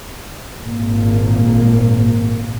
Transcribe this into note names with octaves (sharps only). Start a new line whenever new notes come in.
G#1 A#2 A#3